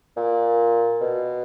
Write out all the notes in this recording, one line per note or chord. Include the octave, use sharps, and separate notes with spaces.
A#2
B2